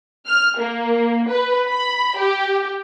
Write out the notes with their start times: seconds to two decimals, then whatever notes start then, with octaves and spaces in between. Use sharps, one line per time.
0.27 F6
0.58 A#3
1.28 B4
1.68 B5
2.17 G4